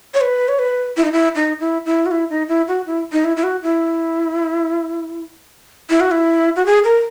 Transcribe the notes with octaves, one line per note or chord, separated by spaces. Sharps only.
C#5
B4
C#5
B4
E4
D#4
E4
D#4
E4
E4
F#4
E4
D#4
E4
F#4
E4
D#4
E4
E4
F#4
E4
E4
F#4
E4
F#4
G#4
A#4